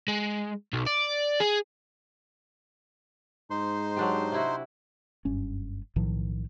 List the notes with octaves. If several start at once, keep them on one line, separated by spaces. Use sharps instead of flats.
G#3
B1
D5
G#4
G#2 D#4 C5 C6
F#3 D4 G4
C3 E4 F#4
F#1 G2 C#4
B1 A2 D#3 F3